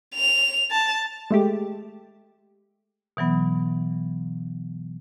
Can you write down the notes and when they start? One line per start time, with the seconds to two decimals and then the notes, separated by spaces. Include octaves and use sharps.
0.15 F7
0.71 A5
1.31 G#3 A3 G4
3.17 B2 E3 F#3 B3